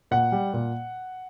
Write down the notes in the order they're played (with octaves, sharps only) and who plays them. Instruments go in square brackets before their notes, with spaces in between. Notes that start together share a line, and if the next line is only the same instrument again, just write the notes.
[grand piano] A#2 F#5
G3
A#2